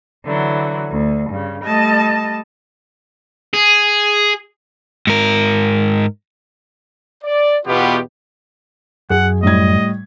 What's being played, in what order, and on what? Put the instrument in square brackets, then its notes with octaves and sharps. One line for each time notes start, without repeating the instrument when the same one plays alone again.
[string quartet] D3 E3 F#3
D2
G2 C#3
G3 A3 D#5 A5
[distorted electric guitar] G#4
[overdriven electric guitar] G#2 A#4
[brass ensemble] D5
E2 B2 B3 F4 G4
[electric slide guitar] F#2 [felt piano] G#4 [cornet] F#5
[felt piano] A2 G3 G#6 [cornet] D#5